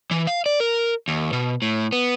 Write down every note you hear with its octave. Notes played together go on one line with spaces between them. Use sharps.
E3
F5
D5
A#4
D#2
B2
A2
B3